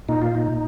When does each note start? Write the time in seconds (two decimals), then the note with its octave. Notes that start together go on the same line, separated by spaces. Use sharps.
0.09 A#2 D#4
0.22 F4
0.35 D#4
0.48 A#2